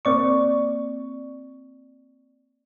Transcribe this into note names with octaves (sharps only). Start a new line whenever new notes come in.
A#3 C4 D5 C#6